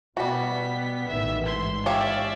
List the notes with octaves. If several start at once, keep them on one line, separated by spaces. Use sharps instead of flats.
B2 G3 B3 F#4 B6
A1 D#3 E3 E5
G#2 C6
G4 C#5 D5 E5 F5